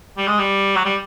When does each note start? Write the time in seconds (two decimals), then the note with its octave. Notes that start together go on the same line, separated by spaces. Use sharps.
0.18 G3
0.28 G#3
0.39 G3
0.76 F#3
0.85 G3